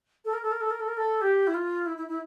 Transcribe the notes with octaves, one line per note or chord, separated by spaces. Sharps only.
A4
A#4
A4
A#4
A4
A#4
A4
A#4
A4
G4
E4
F4
E4
E4
E4